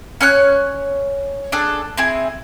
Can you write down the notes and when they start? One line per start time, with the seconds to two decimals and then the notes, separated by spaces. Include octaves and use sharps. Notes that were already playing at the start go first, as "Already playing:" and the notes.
0.21 C#4 C#5 F6 F#6
1.52 D4 G#4 A4
1.97 C4 E4 G#4